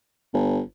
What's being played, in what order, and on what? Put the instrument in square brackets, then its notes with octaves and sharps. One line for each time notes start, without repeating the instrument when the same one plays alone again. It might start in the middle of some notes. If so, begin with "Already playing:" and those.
[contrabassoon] G1